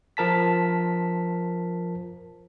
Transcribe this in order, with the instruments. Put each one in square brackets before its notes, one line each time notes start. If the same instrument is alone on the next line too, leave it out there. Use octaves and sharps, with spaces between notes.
[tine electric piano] F3 A#4 A5 B6